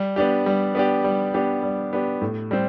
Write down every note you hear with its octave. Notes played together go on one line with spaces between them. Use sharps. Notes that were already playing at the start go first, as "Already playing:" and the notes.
Already playing: G3
B3 D4 G4
G3
B3 D4 G4
G3
B3 D4 G4
G3
B3 D4 G4
A2
G3 C4